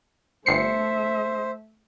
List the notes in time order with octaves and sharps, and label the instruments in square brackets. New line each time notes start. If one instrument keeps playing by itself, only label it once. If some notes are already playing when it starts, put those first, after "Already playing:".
[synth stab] G1 C7 C#7 [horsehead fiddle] A3 E5 [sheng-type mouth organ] C5